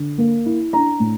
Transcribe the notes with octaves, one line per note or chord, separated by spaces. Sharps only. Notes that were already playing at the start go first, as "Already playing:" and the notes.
Already playing: D3
A#3
E4
D4 A#5
A2